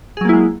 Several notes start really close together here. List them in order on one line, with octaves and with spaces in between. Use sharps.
G#4 F#3 A#3 E4 G#3